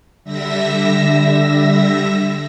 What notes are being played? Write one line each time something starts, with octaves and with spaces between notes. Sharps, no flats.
D3 G3 E5 E6 A#6